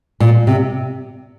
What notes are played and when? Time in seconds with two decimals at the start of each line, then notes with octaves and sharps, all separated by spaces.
0.20 A#2
0.47 C3